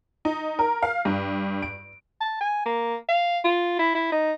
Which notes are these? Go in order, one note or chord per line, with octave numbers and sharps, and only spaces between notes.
D#4
A#4
F5
G2
D7
A5
G#5
A#3
F5
F4
E4
E4
D#4